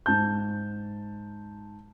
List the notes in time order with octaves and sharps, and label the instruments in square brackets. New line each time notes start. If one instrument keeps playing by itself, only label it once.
[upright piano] G#2 A5 G6